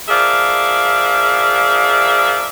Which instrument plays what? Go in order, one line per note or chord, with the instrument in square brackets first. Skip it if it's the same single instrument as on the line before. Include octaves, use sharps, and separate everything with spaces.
[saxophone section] F3 G#4 A#4 D5 E5 F5